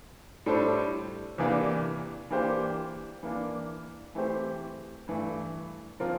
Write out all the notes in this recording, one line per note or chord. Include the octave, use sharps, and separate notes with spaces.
A2 G3 D4 A4 C5
E2 C3 E3 A#3 D4
E3 A#3 D4 G4 C5
E3 A#3 D4
E3 A3 C4 G4 C5
G2 E3 A3
A#2 F3 C4 F4 A#4